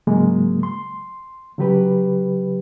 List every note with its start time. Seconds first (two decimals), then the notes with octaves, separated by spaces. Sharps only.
0.07 G#2 C#3 F#3 G#3 A#3
0.63 C6
1.58 C#3 F#3 G4 B4